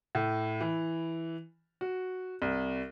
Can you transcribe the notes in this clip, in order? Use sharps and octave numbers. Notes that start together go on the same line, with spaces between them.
A2
E3
F#4
C2